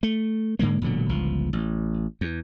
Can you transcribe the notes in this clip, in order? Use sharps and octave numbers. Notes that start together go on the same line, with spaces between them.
A3
G#2 D3 G#3 A#3
E1 A#2 D3 F#3
G1 C#2 F3
A1
E2